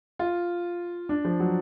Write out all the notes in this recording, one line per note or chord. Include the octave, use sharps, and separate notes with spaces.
F4
D4
F3
F#3